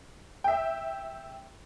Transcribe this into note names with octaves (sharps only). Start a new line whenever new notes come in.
E5 G5